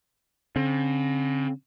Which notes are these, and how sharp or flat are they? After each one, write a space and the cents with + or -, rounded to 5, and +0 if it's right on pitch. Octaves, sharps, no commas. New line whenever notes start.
D3 -45 C4 +30